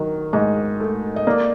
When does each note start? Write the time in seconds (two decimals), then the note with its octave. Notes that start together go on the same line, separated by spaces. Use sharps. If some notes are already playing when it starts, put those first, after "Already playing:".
Already playing: D#3 F#3
0.33 G#2 D#5
0.80 A3
1.16 D#5
1.27 A#3 D5